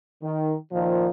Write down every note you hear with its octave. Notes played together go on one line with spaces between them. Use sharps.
D#3
A#2 D#3 F3